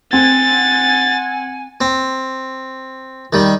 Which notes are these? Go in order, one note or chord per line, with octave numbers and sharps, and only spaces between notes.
C4 F#5 G#5 A6
C4
D#3 G3